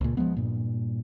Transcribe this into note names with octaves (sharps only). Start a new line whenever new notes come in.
C#2 A#2
F3 G3 G#3 B3
G2 A#2